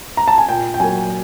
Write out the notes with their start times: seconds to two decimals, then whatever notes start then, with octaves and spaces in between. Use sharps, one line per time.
0.17 A#5
0.28 A5
0.38 G#5
0.49 A#2 G5
0.74 G5
0.80 F#3 A#3 G#5